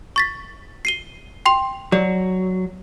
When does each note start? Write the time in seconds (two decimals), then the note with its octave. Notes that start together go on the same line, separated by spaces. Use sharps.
0.16 C#6 A6 B6
0.85 C7 D#7 G7
1.46 G5 C6 F7
1.92 F#3 D5